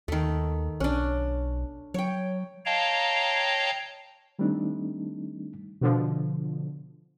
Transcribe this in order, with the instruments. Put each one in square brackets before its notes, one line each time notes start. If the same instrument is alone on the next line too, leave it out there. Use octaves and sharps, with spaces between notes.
[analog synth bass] D#2 [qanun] D#3 A3
[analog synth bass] B1 [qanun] C#4 D4
[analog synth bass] F#3 [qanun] C#5 G5
[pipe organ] C#5 D#5 F5 G5 A5 A#5
[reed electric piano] D#3 G3 A3 C4 D4 D#4
[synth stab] B2 D3 F3